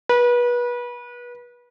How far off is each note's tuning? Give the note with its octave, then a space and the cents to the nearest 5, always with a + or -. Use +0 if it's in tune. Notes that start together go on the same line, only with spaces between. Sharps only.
B4 -30